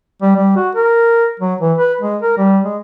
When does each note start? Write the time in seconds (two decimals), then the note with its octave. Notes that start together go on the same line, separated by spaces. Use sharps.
0.22 G3
0.36 G3
0.57 F#4
0.75 A#4
1.40 F#3
1.61 E3
1.78 B4
2.01 G#3
2.22 A#4
2.37 G3
2.64 G#3